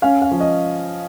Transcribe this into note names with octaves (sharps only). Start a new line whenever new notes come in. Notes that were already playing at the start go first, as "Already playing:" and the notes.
C#4 F5
F5
F3
D#5